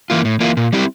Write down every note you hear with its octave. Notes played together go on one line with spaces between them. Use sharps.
E3 A#3 F4
A2
E3 A#3 F4
A#2
G3 C4 E4 G4